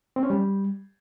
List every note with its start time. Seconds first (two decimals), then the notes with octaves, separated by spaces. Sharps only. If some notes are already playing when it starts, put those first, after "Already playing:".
0.16 C4
0.23 C#4
0.30 G3